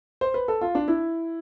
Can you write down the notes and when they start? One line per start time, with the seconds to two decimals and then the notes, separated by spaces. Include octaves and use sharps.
0.21 C5
0.34 B4
0.48 A4
0.61 F4
0.75 D4
0.88 E4